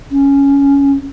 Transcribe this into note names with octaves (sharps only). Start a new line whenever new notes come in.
C#4